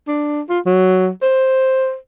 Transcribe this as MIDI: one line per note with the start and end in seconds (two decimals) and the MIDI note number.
0.08 0.41 62
0.50 0.59 65
0.66 1.09 54
1.22 1.96 72